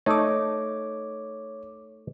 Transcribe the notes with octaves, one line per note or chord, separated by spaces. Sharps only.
A3 D#4 C#5 D6